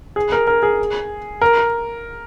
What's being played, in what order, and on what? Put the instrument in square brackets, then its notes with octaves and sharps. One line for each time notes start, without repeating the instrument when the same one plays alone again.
[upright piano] G#4
A#4
A#4
G#4
A#4